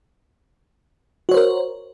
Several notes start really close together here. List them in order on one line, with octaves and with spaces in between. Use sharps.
F#4 C#5 C5 A#4